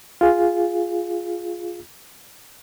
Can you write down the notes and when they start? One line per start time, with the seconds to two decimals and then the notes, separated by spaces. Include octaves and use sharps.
0.21 F4 G#4